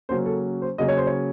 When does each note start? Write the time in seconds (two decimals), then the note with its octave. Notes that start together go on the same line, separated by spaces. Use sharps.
0.09 C#3 F#3 A#3 C#4 C5
0.26 A4
0.62 C5
0.78 C#3 F#3 A#3 C#4 D#5
0.88 C#5
0.98 C5
1.07 C#5